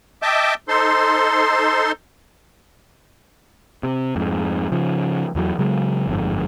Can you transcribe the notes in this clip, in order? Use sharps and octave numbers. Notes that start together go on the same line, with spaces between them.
D#5 E5 G5 A5 D6
D#4 A4 C5 C6
C3
F2 G#2
C#3 F3
E2 E3 F#3
C#3 F#3 G#3
G1 F2 G#2